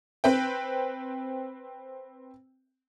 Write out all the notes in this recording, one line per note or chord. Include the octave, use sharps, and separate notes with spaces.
C4 B4 G5